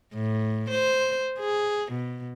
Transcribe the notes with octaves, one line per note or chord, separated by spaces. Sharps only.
A2
C5
G#4
B2